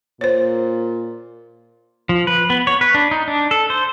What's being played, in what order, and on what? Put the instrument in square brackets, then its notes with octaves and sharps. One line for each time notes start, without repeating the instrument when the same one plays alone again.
[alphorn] A#2 [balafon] C5 C#5
[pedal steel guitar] F3
B4
B3
C#5
B4
D4
D#4
D4
A4
C5